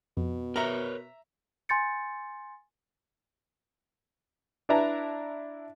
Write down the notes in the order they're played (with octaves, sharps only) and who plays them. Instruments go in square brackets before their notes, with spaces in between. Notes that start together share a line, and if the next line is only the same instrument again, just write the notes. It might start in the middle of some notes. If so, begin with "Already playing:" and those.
[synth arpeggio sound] F2 [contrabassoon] B2
[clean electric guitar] A#4 B4 C#5 [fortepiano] E5 A#5
[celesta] G#5 C6 G6 A6 C#7
[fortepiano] D4 E4 B4 E5 A5 A#5